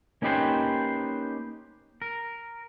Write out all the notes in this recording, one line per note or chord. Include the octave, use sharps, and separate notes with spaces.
A#3 C#4 D#4 G4 B4 C5
A#4